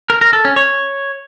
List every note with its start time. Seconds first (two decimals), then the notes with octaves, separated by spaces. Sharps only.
0.10 A#4
0.21 A#4
0.33 A4
0.45 C#4
0.56 C#5